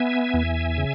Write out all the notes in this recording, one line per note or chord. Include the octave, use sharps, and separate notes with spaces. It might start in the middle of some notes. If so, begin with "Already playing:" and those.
Already playing: B3 E5 G#5
E2
C#3